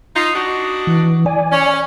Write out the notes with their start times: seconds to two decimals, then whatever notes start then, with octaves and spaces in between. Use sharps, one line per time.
0.16 D#4 F4
0.35 D4 D#4 F#4
0.87 E3
1.26 D5 G#5
1.52 C#4